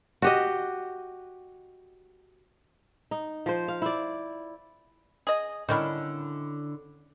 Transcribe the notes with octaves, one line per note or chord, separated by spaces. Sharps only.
F#4 G4 D#5
D#4
F3 C5
F5
E4 D5
G#4 D#5
D3 D#3 C#4 D4 E4